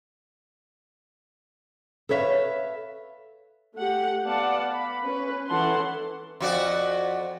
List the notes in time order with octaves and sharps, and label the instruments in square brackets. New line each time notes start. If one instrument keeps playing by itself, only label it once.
[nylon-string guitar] A4 B4 C#5 E5 F5
[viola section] A3 G4 F#5
B3 D5 F5 F#5 A5
B5
C#4 B4
E3 C#4 A4 F#5 A5 C6
[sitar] F2 F#4 D5